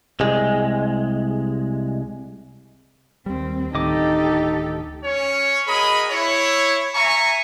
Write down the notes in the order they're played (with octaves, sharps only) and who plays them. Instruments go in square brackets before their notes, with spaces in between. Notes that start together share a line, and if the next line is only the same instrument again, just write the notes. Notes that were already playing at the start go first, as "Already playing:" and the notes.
[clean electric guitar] C2 G#3
[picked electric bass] D#2 G3 [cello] C4
[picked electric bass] D1 D2 D#3 [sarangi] D#4 [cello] G4 A4 [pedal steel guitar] D#5 D6
[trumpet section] C#4 C#5
F#4 G#4 A#4 D#5 A#5 B5
E4 C#5
E5 G#5 A#5 C#6